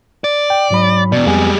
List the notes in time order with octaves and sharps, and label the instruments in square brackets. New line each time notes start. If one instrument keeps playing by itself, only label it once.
[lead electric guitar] D5
[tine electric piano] G5
G#2 F#3 B5
[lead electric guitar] E2 B2 [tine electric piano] D5
[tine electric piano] F2 B3 G#5 [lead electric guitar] G3 G#3